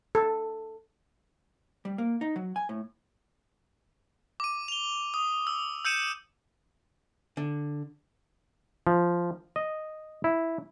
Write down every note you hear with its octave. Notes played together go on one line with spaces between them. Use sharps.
A4
G3
A#3
D#4
F#3
G#5
A2
D6 D#7
F7 G7
D#6
E6
E6 G6 C#7 D#7 E7
D3
F3
D#5
E4